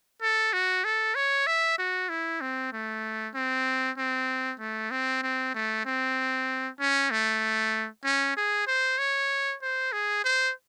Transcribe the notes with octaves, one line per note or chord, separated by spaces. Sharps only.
A4
F#4
A4
C#5
E5
F#4
E4
C4
A3
C4
C4
A3
C4
C4
A3
C4
C#4
A3
C#4
G#4
C5
C#5
C5
G#4
C5